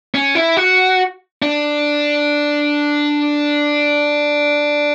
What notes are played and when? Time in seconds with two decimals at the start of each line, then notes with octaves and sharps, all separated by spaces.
0.14 C#4
0.35 E4
0.57 F#4
1.42 D4